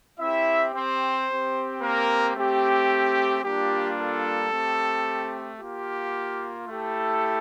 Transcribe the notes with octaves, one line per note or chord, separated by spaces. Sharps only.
C4 E4 G4 E5
C4 C5
C4 G4
A#3 A#4
A3 C4 G4
G3 A#3 D4 F4 G4
A4
A3 C4 G4
A#3 F4 G4
A3 E4 G4 A4